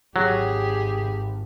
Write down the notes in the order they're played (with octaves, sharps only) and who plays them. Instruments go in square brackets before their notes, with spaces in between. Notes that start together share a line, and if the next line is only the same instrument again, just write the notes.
[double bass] G#1 [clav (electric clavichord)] F#3 [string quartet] G4 [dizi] G#4